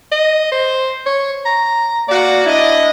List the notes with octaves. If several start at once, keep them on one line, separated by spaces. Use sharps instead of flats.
D#5
C5
C#5
A#5
A#3 F#4 D5
D4 E4 D#5